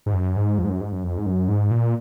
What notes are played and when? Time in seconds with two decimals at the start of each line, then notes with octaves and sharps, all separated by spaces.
0.06 G#2
0.14 F#2
0.36 G#2
0.58 F2
0.64 G#2
0.69 F#2
0.81 G#2
0.92 F#2
1.03 F2
1.18 G#2
1.26 F#2
1.48 G#2
1.71 A#2